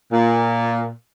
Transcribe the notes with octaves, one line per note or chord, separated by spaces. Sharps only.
A#2